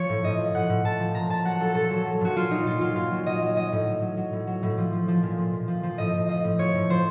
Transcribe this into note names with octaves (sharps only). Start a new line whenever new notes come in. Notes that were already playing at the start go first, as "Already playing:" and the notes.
Already playing: F3 C#5
A2
A2 D#5
F3
A2 F#5
A2
A2 A5
F3
A#2 A#5
A#2 A5
F#3 F#5
F#3 A4
A#2 A4
F#3
F#3
A#2 F#4
F#3 F4
F#3 D#4
A#2 F4
F#3 F4
A#2 F4
F#3
F#3 D#5
F#3
F#3 D#5
A2
F#3
F#3
F#3
A2
F#3
A2
F3
F3
F3
A#2
F3
A#2
F3
F3
A2 D#5
A2
F3 D#5
A2
F3 C#5
A2
F3 C5